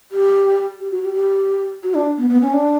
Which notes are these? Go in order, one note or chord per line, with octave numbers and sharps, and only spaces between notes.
G4
G4
F#4
G4
G4
F#4
D4
B3
B3
C#4
D4